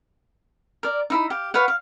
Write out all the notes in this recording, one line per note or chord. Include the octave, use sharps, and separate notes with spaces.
A#4 D5
D#4 E4 B5
G4 F5
B4 C#5 F5 F#5
F5